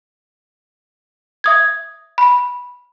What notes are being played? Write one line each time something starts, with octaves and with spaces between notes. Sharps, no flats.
E5 D#6 G#6
B5